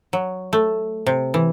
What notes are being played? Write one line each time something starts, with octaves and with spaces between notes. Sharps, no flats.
F#3
A3
C3
E3